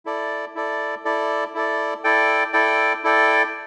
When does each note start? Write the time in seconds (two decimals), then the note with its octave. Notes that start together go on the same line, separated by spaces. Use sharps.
0.05 E4 A4 D5
0.55 E4 A4 D5
1.05 E4 A4 D5
1.54 E4 A4 D5
2.04 E4 A4 D5 G5
2.53 E4 A4 D5 G5
3.03 E4 A4 D5 G5